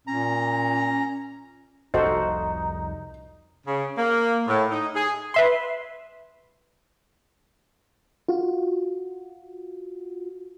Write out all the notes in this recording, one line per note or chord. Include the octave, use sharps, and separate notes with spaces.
A#2 C#4 A#5
F1 C2 D#4 F#4 A4 C5 D#5
C#3
A#3
A2
D#4
G#4
B4 E5 C6
F4 F#4